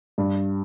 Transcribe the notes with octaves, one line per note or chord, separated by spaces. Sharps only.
G2